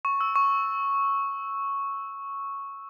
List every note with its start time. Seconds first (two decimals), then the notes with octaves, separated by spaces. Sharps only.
0.05 C#6
0.21 E6
0.36 C#6